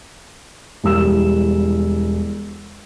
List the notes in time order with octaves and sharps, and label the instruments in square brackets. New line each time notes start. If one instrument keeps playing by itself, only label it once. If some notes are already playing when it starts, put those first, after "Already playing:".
[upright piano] E1 G3 E6 E7